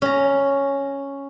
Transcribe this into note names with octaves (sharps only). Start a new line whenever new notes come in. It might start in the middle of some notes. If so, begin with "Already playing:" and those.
C#4 A#5